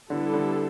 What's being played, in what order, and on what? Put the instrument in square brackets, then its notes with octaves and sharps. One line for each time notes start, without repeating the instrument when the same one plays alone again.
[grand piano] D3 [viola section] G3 B3 E4 A4
[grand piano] D3